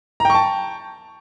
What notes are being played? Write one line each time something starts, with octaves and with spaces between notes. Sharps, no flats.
G5 A5 A#5 C#6